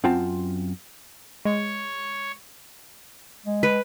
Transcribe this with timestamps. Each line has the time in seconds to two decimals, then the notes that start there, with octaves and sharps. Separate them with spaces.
0.04 F#2 C4 F4 G5 A5
1.45 G#3 C#5
3.46 G#3
3.63 B4